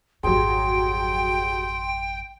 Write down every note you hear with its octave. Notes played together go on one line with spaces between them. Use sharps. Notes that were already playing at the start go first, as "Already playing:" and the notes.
G#1 F2 F#3 G4 G#4 G5 C6